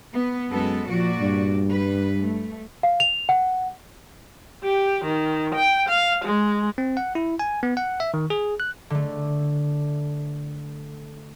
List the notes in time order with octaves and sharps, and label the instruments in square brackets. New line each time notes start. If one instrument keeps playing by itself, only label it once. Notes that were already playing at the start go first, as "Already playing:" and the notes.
[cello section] B3
[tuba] F#2 [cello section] G#3 B3 A4
[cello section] A#2 F#4 D5 [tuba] F3
[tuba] G2
[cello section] G3 B4
A3
[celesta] F5
F7
F#5
[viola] G4
D#3
G5
F5
G#3
[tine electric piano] C4
F#5
E4
G#5
B3
F#5
E5
D#3
G#4
F#6
[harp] D3 A3